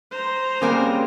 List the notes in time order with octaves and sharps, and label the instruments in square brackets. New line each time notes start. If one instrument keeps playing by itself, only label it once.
[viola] C5 A#5
[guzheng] G3 G#4 A#4 [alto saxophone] A#3 [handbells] C4 C#4